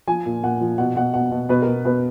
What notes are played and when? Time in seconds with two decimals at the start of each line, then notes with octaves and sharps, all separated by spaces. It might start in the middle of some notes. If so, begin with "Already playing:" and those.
0.07 F3 G#5
0.26 A#2
0.43 A#2 F#5
0.61 F3
0.78 B2 F#5
0.96 B2 F#5
1.14 B2 F#5
1.31 B2
1.49 B2 B4
1.62 B2 A#4
1.85 B2 B4